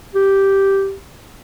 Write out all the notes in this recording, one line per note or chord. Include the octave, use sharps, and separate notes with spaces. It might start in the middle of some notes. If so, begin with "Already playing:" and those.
G4